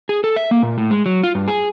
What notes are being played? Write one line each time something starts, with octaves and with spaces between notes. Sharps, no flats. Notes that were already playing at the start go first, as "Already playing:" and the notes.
G#4
A4
E5
A#3
A#2
A2
G#3
F#3
F4
G2
G#4